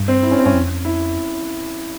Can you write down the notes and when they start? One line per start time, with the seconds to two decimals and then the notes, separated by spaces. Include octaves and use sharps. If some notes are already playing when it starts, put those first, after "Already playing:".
Already playing: G2
0.08 C4
0.23 E4
0.31 C#4
0.39 C4
0.46 G2 C#4
0.54 F2
0.85 E4